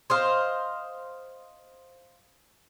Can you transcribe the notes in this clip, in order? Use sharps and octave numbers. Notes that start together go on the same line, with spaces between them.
C5 D#5 F5